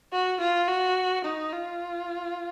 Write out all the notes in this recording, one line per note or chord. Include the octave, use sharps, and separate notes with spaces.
F#4
F4
F#4
D#4
F4